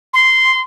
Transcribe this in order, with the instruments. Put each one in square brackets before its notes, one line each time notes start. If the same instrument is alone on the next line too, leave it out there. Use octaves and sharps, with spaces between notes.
[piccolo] C6